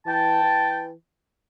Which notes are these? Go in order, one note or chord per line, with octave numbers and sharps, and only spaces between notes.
E3 G5 A5
E3